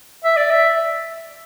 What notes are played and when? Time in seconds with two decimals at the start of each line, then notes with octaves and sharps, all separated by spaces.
0.24 E5
0.37 D5
0.51 E5